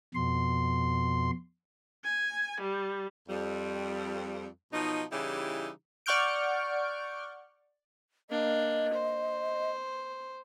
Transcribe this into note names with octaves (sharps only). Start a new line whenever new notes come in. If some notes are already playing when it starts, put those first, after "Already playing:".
F2 B2 C6
G#5
G3
F2 G3
B2 F3 F#3 D#4
C#3 E3 G3 D#4 E4 G4
D5 F#5 C#6 F6 G6 D7
A#3 D4 D#5
C5